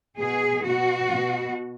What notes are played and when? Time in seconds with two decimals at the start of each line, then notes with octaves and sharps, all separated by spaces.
0.21 B2 G#4
0.67 B2 F#4
1.13 B2